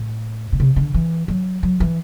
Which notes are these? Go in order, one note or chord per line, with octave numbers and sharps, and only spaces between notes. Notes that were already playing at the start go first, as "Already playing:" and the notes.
Already playing: A2
B2
C3
D3
E3
F#3
F#3
E3